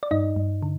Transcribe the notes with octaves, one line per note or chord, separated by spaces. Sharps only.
D5
G2 D#4 D#5
G2
D3